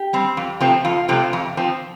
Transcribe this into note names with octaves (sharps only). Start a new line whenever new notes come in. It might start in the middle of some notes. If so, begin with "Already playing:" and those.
Already playing: G4
G3 C4
F2
C3 F3 A3 C4
F2 F4
C3 F3 A3 C4
F2
F3 C4